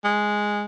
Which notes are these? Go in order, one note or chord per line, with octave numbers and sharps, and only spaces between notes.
G#3